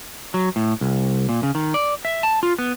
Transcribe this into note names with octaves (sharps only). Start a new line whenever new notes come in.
F#3
A2
C2
A#2
C#3
D#3
D5
E5
A5
F4
B3